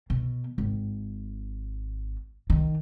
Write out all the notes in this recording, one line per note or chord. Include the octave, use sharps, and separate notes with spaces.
B2
G#1
D#3